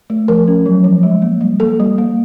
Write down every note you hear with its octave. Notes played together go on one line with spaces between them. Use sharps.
A3
F3 A#4
C#4
F#3
F3
G#3
A#3
G3
A#3 A4
G3
A#3